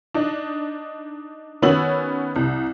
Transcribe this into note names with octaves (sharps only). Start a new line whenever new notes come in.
D4 D#4
D#3 B3 C#4 F#4 E6 F#7
C2